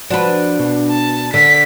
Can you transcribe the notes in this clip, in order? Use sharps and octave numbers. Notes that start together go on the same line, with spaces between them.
F3 D4 F#4 B4
B2
A5
D3 B6